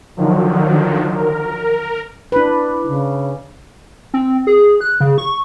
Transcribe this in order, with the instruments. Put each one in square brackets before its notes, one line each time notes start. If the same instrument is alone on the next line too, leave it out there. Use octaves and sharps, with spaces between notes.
[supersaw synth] D3 D#3 F3 F#3
A#4
[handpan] D4 B4 [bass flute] E4
[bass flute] C#3
[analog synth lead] C4
G#4
F#6
C#3
C#6